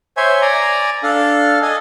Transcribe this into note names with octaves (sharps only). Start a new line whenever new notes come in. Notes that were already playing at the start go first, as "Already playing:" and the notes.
C5 C#5 E5 G#5
D5 G#5 A#5
D4 A4 F5
A4 D#5 G#5